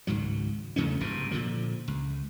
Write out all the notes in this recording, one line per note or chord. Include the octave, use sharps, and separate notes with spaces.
G#1 C#2 G#2 F#3
E2 C#3 A3 C#4
F#1 C2 G#2 B2
A#2 D3 F3
C#2